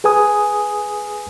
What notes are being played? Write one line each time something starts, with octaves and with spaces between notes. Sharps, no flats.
G#4 B4 G#5 D#6